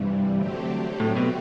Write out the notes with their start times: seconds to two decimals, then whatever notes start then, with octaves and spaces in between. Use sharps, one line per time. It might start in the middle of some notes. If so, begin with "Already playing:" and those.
Already playing: G2 C3 E3 G3
0.34 D3 F#3 A3 C4 G4
1.00 A2
1.16 B2